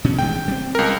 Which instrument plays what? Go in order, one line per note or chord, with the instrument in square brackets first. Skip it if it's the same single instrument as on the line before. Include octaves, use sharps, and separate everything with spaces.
[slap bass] B2 C#4
[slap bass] A1 D#3 G#3 [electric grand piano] G5
[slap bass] G3 C4
[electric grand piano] C#2 A#4